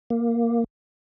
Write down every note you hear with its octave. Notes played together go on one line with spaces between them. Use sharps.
A#3